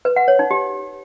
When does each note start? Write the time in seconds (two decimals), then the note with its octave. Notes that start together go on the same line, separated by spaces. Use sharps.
0.05 B4
0.16 F#5
0.28 C#5
0.39 D#4
0.51 G4